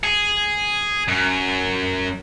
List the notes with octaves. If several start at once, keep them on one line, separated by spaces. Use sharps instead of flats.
G#4
F#2